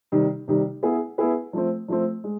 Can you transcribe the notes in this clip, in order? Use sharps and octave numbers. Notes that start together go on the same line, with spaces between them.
C3 D#3 G3
C3 D#3 G3
B3 E4 G#4 B4
B3 E4 G#4 B4
F3 A3 C4
F3 A3 C4
G#3